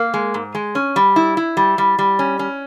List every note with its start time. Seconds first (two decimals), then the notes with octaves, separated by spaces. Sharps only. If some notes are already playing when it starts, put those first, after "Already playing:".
Already playing: A#3
0.14 G#3
0.34 G#2
0.55 G#3
0.75 C#4
0.96 G3
1.16 E4
1.37 E4
1.57 G3
1.78 G3
1.99 G3
2.19 C#4
2.39 C#4